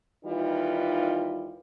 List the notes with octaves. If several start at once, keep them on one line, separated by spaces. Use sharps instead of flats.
D#2 E3 G3 D#4 F4